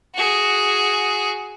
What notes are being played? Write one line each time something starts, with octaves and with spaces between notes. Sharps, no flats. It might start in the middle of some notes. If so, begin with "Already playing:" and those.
F#4 G#4